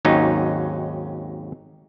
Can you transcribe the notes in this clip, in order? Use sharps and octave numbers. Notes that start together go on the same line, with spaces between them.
G#1 D#2 F#3 C#4 D#4